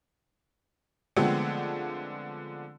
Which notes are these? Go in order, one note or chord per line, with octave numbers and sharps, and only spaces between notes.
D3 F3 G#3 A3 B3 C4